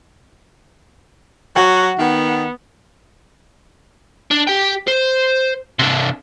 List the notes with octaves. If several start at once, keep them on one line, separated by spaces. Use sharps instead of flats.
F#3 F#4 F#5
D#3 B3
D4
G4 G5
C5
C3 D4